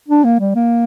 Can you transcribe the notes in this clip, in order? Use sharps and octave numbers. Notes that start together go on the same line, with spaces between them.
D4
A#3
G3
A#3